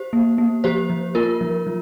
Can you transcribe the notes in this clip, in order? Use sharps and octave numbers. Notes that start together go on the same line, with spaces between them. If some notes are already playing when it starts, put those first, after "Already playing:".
Already playing: G4 C5
A#3
A#3
F3 G4 C5
F3
A#3 F4 A#4
F3
F3